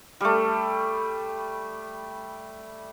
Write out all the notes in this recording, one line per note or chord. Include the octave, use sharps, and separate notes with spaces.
G3 A3